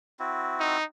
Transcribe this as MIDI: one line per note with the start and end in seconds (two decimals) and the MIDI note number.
0.20 0.77 60
0.20 0.77 64
0.20 0.77 66
0.60 0.84 63